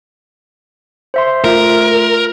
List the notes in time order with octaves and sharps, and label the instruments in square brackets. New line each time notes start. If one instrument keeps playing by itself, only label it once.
[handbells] C5 E5 C6
[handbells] A3 F4 E5 [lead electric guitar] A#4